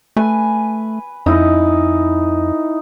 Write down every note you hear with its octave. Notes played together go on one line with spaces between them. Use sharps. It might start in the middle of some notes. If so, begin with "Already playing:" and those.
A3 B4 G#5
F2 D#4 E4 D#5